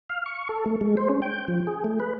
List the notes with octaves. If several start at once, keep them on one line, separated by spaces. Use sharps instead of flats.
F5
C#6
A4
A3
G#3
C5
C#4
G5
F3
G#4
A3
B4